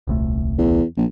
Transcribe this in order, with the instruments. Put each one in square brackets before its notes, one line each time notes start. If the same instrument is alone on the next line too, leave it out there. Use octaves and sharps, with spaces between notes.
[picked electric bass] D#1 C2 A3
[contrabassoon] E2
A#1